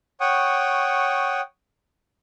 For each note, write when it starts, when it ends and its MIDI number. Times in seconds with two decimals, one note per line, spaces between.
0.20 1.41 73
0.20 1.41 78
0.20 1.41 79
0.20 1.41 85
0.20 1.41 87